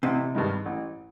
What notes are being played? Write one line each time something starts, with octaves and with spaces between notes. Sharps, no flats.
A1 C3
G2 D#3 G#3
A1